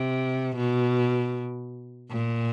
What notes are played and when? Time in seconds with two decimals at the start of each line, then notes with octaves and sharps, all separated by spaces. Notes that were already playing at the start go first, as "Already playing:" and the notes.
Already playing: C3
0.56 B2
2.10 A#2